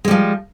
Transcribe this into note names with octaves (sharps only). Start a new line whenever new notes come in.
F3 G3 G#3